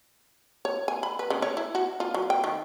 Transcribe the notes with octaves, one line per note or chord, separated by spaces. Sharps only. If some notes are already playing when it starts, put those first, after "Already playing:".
C#5
G#5
B5
B4
C#3
C#5
E4
F#4
F4
F#3
G5
D#3